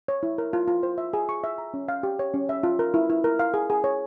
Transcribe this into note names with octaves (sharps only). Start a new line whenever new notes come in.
C#5
E4
A#4
F4
F4
C5
E5
G#4
C#6
E5
A#5
C#4
F5
G4
C#5
C#4
E5
F4
A#4
E4
E4
A#4
F5
G#4
G#4
C#5